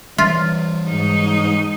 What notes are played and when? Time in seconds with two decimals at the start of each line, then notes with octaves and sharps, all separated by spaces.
0.18 E3 G3 F4
0.89 G#2 D#4